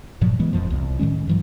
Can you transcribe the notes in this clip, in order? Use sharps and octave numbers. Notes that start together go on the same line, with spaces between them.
G2 A#2 F3 F#3
E3 G#3 B3
F1 B1 F2 F3
C2
A2 D#3 G#3 C#4
G2 E3 F#3